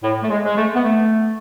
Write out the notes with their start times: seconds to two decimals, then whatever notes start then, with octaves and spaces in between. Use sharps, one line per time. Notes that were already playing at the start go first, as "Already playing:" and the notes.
0.03 A2
0.23 A3
0.29 G#3
0.44 G#3
0.57 A3
0.75 B3
0.84 A3